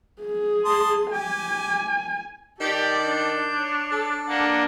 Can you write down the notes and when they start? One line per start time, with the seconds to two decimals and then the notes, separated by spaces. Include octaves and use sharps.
0.22 G#4
0.65 A5 C6 D#6
1.11 G4 G#5
2.60 D#3 G4 A4 D5 G6
3.05 D4
3.58 C#5
3.92 A4
4.29 A#3 D4 F#5